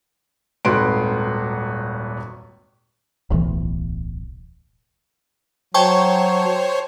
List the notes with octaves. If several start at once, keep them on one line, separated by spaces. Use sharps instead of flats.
D#1 G#1 F#4 B4 C6 D7
D1 B1 A2 E3
F#3 C5 C#5 G5 A5 C#6